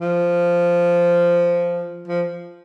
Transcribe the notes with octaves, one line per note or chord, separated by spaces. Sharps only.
F3
F3